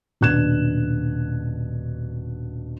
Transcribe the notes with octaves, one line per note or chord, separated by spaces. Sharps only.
D#1 B2 D4 F#6 G#6 E7